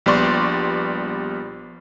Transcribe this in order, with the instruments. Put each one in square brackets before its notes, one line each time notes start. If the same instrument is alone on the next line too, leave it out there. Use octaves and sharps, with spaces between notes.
[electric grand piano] A#1 G3 B3 D5 C6 C#6